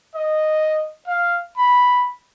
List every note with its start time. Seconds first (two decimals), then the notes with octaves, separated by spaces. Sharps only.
0.15 D#5
1.07 F5
1.57 B5